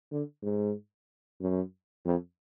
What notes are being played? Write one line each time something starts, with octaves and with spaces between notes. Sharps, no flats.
D3
G#2
F#2
F2